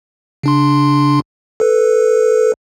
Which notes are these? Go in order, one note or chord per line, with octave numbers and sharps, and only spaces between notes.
C#3 D4 C6
A4 B4